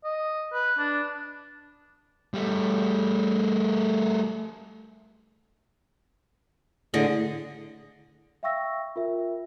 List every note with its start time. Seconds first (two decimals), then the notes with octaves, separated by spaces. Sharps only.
0.05 D#5
0.53 B4
0.78 D4
2.34 G3 A3
6.94 A2 D3 G#4 D#5
8.43 E5 F5 G5 C#6 E6 A#6
8.96 F4 A#4 E5